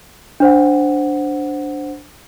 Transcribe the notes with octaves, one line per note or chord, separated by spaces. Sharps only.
D4 C5 F#5